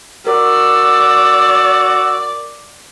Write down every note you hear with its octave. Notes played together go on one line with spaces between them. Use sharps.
F#4 A#4 D5 E6